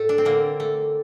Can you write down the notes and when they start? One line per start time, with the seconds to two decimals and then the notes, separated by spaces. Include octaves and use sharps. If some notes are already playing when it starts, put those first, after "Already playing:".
Already playing: A2 A3
0.09 D4
0.18 C4
0.25 D3 A#3
0.60 A3